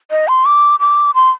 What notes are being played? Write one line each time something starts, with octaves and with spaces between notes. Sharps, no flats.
D#5
C6
D6
D6
C6